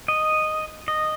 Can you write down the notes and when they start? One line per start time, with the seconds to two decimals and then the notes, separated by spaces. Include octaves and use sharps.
0.08 D#5
0.88 D#5